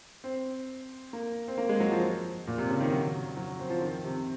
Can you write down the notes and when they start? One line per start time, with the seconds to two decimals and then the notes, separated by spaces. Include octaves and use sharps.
0.24 C4
1.13 A#3
1.48 C4
1.58 A#3
1.69 G#3
1.80 F#3
1.92 F3
2.47 A#2
2.58 C3
2.70 C#3
2.80 D#3
2.92 F#3
3.37 F#3
3.59 C4
3.70 F3
3.82 D#3
4.04 C3